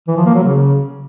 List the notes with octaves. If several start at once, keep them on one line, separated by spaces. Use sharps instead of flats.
E3
F3
A#3
F#3
C#3